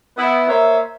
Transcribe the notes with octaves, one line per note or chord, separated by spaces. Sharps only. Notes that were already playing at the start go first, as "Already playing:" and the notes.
B3 E4
A#3 C5 C#5 E5